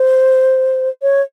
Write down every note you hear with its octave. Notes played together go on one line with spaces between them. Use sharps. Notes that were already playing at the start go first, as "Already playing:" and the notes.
Already playing: C5
C#5